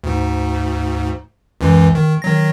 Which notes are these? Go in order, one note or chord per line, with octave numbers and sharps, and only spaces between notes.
D2 G#2
C#2 F#2 E3
D#3
D#3 F#3 A#6